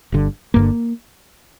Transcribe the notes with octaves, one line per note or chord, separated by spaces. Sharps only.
G1 G2 D3
G1 G2 D3 A#3